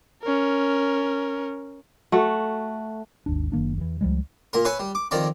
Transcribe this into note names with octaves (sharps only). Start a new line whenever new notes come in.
C#4 A#4
A3 F#4
G#1 D#2 D4
F#1 D#3 A#3 D4
E2 E3
C#2 F3 G3 G#3
A#2 A#4
B4 C#5 E5 G#5
G3
D6
F2 D#3 D5 A#5